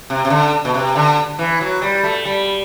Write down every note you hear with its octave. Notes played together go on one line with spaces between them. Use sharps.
C3
C3
D3
B2
C3
D3
E3
F#3
G3
A3
G3